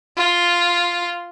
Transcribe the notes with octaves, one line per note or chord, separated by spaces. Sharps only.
F4